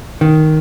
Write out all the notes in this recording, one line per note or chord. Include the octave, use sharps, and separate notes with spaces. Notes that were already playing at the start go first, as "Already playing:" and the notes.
D#3